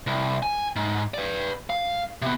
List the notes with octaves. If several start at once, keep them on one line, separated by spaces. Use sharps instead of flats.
C2
G#5
G#2
B4 D5
F5
C3 B3